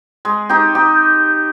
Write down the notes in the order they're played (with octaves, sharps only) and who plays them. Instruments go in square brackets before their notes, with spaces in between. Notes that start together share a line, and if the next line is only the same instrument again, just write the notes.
[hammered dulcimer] G#3
D#4 G4
D#4 G4